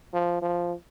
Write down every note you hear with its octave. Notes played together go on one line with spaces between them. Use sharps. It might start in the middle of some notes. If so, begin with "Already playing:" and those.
F3
F3